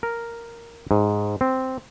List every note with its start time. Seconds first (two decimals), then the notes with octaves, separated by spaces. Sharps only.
0.03 A#4
0.91 G#2
1.41 C4